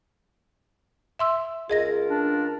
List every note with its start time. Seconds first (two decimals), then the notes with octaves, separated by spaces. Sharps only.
1.19 E5 C6 E6
1.70 C#2 F4 G#4 A#4 D#5 A#6
2.09 D4